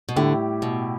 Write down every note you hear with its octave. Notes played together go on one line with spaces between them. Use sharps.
B2
A2 D3 G3 E4 G4
B2